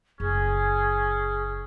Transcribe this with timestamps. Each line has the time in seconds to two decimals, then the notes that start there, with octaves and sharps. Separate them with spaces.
0.20 F#1 C#4 G#4